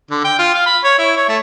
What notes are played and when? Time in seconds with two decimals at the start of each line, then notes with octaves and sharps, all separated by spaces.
0.11 D3
0.24 G5
0.39 F4
0.54 F5
0.66 B5
0.84 C#5
0.98 E4
1.16 C#5
1.29 A3